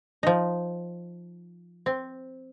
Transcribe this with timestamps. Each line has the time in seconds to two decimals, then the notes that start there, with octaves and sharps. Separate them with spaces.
0.23 F3 D#4
1.86 C4